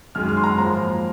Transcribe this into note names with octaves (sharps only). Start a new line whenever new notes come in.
F#2 D#3 G#3 F6
F6
C6
A#5
G#2 F3 A#3 A#5